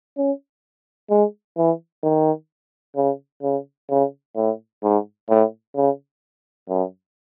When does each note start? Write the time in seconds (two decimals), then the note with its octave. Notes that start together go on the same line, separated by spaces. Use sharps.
0.17 C#4
1.10 G#3
1.57 E3
2.03 D#3
2.96 C#3
3.43 C#3
3.90 C#3
4.36 A2
4.83 G#2
5.29 A2
5.76 C#3
6.69 F#2